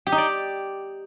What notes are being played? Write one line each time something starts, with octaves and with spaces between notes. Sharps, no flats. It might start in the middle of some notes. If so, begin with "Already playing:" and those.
G4
D#4
D5